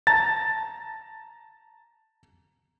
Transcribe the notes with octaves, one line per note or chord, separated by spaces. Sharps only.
A5 A#5 A6